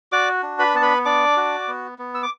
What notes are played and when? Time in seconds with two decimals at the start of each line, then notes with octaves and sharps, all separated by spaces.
0.12 F#4 D5 D6
0.43 D4
0.59 B4 B5
0.74 B3 A5
0.82 B4 B5
1.05 D4 D5 D6
1.37 F#4
1.68 B3
1.98 B3
2.14 E6
2.23 D6